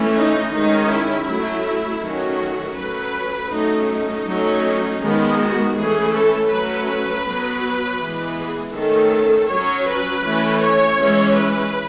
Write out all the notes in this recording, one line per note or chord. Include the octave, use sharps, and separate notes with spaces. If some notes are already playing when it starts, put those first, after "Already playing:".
Already playing: E3 A3 C#4
D#4
D#3 G#3 C#4 D#4
E4
F#3 A3 C#4
D#3 F#3 A3 C#4 F#4
F#3 A3 C#4 B4
F#3 A3 C#4 D#4
D#4
F#3 A3 C#4
D#3 G#3 B3
F#4
E3 A3 C#4 G#4
A4
F#3 A3 C#4 B4
B4
F#3 B3
E3 G#3 B3
G#4
D#3 A3 C#4 A4
F#3 C#4 C#5
B4
E3 A3 C#4
C#5
E3 G#3 C#4
B4